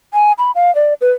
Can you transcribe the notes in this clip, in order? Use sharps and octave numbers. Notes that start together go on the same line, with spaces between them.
G#5
B5
F5
D5
B4